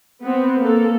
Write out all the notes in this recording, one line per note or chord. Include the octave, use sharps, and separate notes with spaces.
B3 C4
A#3 A4